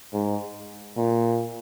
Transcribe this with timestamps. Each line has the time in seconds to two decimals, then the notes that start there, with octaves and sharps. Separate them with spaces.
0.13 G#2
0.97 A#2